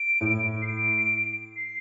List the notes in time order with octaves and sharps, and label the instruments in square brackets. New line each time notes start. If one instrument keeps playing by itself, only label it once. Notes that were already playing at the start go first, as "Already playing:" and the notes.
Already playing: [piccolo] D7
[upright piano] A2
[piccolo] C7
D7
C7